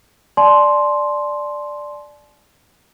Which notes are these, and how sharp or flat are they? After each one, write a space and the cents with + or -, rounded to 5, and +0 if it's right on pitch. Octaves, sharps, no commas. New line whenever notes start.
D5 +5 A5 -45 C6 +0